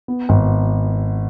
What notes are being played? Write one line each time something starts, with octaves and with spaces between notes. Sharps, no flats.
B3
G#1